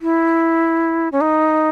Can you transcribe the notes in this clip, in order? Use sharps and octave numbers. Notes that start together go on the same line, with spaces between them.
E4
C#4
D#4